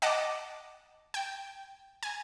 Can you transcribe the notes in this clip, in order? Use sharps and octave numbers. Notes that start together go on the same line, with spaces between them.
D#5 F#5 A5 D6
G5
G#5